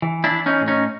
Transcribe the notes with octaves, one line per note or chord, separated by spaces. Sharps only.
E3
D4 E4
E3
C#4 D#4
A2
C#4 D#4